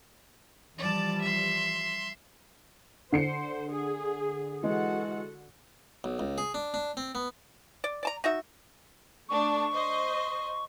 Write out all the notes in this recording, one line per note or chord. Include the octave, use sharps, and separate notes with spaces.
E3 F3 G3 D5 A5
E5 C6
D3 C5 C7 C#7
G#4
E3 G#3 F#4 A4 F#5
B1
C#2
G#4
D4
D4
C4
B3
D5
D5 A5 A#5
D#4 F#4 E5
A3 D4 C#6
C5 D#5